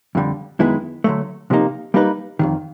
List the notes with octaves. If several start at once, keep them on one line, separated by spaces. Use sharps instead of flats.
F2 D3 G3
F#2 D#3 G#3 B3 E4
D3 F#3 A3
C3 F3 A#3 D#4
G3 A#3 D#4 G4 B4
F2 C3 D#3